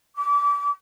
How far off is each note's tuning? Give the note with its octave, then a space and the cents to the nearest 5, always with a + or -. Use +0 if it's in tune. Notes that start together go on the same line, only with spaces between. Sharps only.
D6 -30